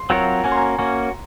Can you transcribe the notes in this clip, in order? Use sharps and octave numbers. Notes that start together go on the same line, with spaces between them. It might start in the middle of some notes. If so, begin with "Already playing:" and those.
Already playing: C6
F#3 C4 F4 A#4 C#5 F#5
A#3 C#4 F#4 G#5
C6
A#5
A#3 C#4 F#4